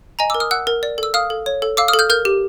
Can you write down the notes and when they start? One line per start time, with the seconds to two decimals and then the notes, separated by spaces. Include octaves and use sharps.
0.19 D#5 G#5 A#5
0.30 A#4 D6 E6
0.40 D#6 F6
0.51 F#5 E6 F#6
0.67 A#4
0.83 D5
0.98 A4 E6
1.14 F5 D#6 F6
1.30 A4
1.46 C#5
1.62 A4
1.77 F5 D6 E6
1.88 D#6 F6
1.94 A4
1.99 F6 G6
2.10 A#4 F6 G6
2.25 G4